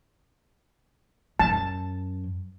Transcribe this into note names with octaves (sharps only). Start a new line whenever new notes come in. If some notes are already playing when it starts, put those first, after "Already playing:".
F#2 A5